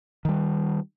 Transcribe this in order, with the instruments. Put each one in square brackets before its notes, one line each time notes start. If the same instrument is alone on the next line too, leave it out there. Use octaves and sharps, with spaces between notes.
[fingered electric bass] D#3 G3